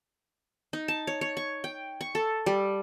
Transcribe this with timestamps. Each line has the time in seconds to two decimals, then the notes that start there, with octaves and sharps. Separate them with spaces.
0.73 D#4
0.88 A5
1.07 C#5
1.21 C#5
1.37 C#6
1.64 G5
2.01 C#6
2.15 A4
2.46 G3